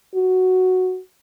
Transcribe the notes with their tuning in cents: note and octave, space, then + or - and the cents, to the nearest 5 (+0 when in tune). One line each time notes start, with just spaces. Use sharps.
F#4 +0